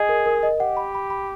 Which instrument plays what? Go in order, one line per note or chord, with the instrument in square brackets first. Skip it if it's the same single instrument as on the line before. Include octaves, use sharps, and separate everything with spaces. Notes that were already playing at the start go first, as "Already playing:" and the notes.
Already playing: [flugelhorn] G#4 [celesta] D#5
[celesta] A#4
A#4
D#5
[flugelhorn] G4 [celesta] F#5
[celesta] B5
B5
B5